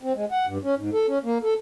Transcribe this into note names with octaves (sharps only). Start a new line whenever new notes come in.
C4
G#3
F#5
G2
C#4
G#2
A4
C#4
A#3
A4